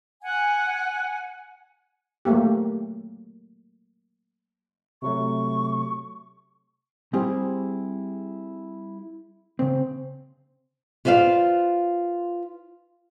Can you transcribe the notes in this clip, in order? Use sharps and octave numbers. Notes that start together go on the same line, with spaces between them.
F#5 G#5
F#3 A3 A#3 G4
C3 F#3 A3 C#6
G3 C4 E4 G4 G#4
C#3 C4
F4 B4 C5 D5 F5